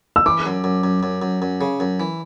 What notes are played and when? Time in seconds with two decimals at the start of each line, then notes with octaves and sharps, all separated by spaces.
0.16 E6
0.26 E3 D6
0.46 F#2
0.64 F#2
0.83 F#2
1.03 F#2
1.22 F#2
1.42 F#2
1.61 C#3
1.80 F#2
2.00 E3